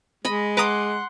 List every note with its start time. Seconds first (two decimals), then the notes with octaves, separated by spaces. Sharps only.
0.25 G#3 D#5 B5
0.57 B4 F#5 A#5 C6 D6 D#6